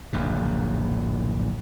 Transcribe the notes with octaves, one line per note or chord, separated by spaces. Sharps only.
D1 A#1 F#2 C#3